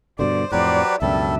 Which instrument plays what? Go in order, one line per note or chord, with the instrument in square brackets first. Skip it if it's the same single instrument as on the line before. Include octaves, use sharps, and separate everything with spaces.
[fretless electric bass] G2 B2 D3 [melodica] C5 [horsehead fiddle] D5
[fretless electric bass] F2 A2 [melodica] F#3 G4 B4 [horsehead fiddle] C5 D5
[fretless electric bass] C#2 F#2 B2 [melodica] G3 A4 [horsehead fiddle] D4 E5